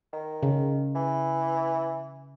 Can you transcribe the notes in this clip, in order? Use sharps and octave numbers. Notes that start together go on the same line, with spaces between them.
D#3
C#3
E3